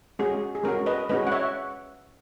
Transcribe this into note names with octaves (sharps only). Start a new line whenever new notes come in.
G#3 C#4 F#4 G#4
G#4
G#3 C#4 F#4 A#4
B4 D#5
G#3 C#4 F#4 B4 D#5
F#5
C#5 E5